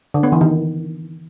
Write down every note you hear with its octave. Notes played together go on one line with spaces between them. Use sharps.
D3
B3
E3
D#3